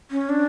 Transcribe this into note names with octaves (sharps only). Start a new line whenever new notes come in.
C#4
D4